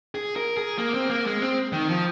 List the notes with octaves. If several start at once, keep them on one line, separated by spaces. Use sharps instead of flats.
G#4
A#4
G#4
A#3
C4
A#3
G#3
C4
D#3
F3